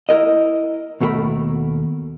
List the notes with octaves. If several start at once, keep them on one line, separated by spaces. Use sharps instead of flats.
E4 A#4 D#5
D#2 B2 A3 F#4 A#4 B5